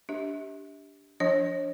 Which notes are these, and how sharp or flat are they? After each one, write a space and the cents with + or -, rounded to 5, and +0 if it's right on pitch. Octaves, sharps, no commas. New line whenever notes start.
D4 -20 G4 +0 E5 -40
F3 +0 D4 -25 C#5 -30